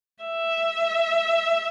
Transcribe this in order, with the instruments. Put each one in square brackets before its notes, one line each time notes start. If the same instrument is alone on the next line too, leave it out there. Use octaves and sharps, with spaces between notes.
[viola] E5